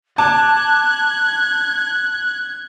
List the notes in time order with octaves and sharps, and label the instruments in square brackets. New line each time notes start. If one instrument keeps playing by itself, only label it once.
[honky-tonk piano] A5 D6 [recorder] F#6 [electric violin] G#6